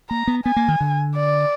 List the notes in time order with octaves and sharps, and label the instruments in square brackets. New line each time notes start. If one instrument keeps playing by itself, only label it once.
[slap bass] A#3 [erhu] A#5
[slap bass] B3
[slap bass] B3 [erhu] G#5
[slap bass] A#3
D#3
D3
[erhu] D5